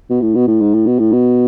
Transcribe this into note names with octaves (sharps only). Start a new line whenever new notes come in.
B2
A2
B2
A2
G#2
A2
B2
A2
B2